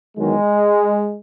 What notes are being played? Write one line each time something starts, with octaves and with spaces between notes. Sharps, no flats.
E2 D#3 F#3 G#3